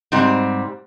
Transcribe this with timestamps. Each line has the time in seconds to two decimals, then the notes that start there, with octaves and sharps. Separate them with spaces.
0.12 G#2 G3 C4